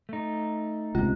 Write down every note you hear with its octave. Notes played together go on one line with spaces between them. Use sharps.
A3 D#4
C#2 C3 F4